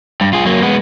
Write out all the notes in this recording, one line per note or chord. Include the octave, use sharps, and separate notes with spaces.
G2
F4 G#4
F#3 A#3
G#3 B3